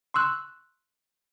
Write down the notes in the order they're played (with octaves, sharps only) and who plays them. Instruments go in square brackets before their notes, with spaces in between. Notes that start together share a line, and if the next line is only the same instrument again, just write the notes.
[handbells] C6 C#6 E6 F#6